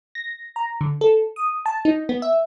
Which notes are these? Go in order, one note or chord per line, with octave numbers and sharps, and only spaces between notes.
A#6
A#5
D3
A4
D#6
A5
D#4
B3
E5